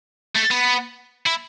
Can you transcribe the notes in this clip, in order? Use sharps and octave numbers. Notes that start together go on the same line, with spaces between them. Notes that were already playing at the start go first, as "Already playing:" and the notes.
A3
B3
E4